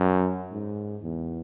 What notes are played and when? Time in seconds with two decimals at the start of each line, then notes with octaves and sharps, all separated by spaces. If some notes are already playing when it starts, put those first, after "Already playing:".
Already playing: F#2
0.52 G#2
1.03 E2